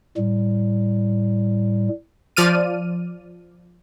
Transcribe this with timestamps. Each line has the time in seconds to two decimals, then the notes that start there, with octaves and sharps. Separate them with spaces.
0.17 A2 G3
2.37 F3 D5 F6 D#7